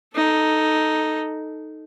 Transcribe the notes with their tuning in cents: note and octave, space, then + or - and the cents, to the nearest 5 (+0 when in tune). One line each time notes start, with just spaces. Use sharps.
D#4 +0 A4 +0